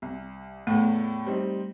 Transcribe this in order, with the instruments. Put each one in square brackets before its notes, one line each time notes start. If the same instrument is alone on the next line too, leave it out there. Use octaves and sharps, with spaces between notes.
[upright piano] C2
[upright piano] E2 A2 [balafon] A3
[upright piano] G3 C4 D#4